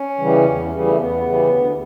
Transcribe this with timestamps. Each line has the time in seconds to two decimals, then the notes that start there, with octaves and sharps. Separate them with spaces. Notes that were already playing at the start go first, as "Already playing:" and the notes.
Already playing: C#4
0.18 C#3 E3 G3
0.45 E2
0.70 C#3 E3 G3
0.86 A3
0.96 E2 B3
1.22 C#3 E3 G3
1.48 D2